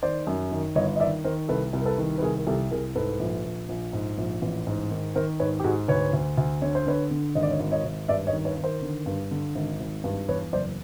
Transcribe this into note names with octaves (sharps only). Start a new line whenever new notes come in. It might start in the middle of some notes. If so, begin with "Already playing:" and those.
D#3 C5 D5
F#2
D#3
G1 C#5 D#5
D#5
D#3 D5 E5
D#3 A#4 C5
C2 A4 B4
C2
A#4
A4 B4
D#3
B4
C2 G#4 A#4
A#4
C2 G4 A4
C2 G#4 A#4
G#2 A4 B4
A#1
A#1
A#1
G#2
A#1
A1
G#2
D#3
D#3 A#4 C5
G#2 B4 C#5
G4
G#2 F#4 G#4
D2 B4 C#5
D2
D2
D3 C#5
C5
D3 B4 C#5
D3
G#1 D#5
D5
C#5 D#5
G#1
C#5 D#5
G#1
G2 D5 E5
C#5 D#5
D#3
B4 C#5
D#3
A#4 C5
D3
G2
D3
G#1
G#1
G2
E2 B4 C#5
F#1 C5 D5